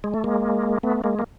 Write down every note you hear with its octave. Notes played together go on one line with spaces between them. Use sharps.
G#3
A3
G#3 A#3
A3 B3
G#3 A#3
A#3